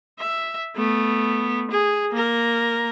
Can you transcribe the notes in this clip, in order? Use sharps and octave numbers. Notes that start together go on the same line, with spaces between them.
E5
A3 B3
G#4
A#3 A#4